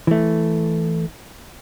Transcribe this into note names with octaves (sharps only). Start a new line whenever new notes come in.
E3 A3